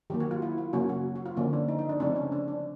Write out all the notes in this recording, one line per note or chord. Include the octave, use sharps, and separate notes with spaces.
D#3 F#3 A#3 G4
F#4
F4
E4
F4
C#3 F#3 A#3 C#4 F#4
F#4
F#4
F4
D3 F3 A#3 C#4
D4
D#4
D#4
D4
C#3 F3 A3 C4 D4
C#4
D4
D4